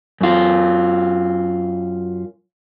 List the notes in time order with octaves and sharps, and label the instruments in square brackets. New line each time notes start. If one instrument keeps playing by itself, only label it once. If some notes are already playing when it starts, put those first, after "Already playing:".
[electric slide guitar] F#2 F4